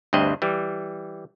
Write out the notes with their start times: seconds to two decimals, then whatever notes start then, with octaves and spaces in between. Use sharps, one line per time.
0.13 D2 G2 C4 D#5
0.42 E3 G3